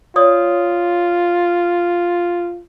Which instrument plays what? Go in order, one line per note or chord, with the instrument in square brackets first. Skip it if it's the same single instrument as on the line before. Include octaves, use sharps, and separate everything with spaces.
[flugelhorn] F4 [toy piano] C#5 D5 D#6